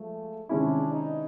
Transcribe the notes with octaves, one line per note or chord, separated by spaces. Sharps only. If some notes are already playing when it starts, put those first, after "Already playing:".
Already playing: F3 G#3 A3
C3 D#3 G#3 C#4 D4 E4
D#4